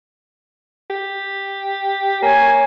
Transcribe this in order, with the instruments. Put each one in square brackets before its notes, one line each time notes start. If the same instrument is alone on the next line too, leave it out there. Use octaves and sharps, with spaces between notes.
[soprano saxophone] G4
[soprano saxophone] A#3 [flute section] C#5 G#5